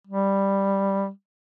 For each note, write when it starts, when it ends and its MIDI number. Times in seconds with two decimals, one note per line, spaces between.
0.07 1.09 55